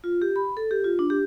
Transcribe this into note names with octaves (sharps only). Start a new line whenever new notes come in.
F4
G4
B5
A4
G4
F4
D4
G4